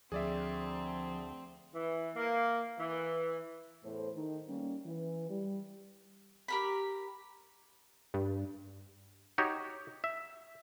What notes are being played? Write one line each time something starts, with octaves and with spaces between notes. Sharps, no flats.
D2 F3 C4 G#4 D5 E5
E3
A#3
E3
E2 A2 A4 C5
D#3 A3 D#4
G3 A#3 C#4
E3
G3
G4 A#4 B5
G2
D#4 F#4 G4 C#5
E5